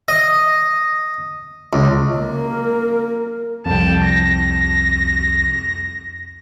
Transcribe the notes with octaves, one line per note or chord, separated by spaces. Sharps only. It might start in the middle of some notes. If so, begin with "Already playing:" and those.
D#5
C#2
A#3 A#4
C2 F2 G5 A5
A#6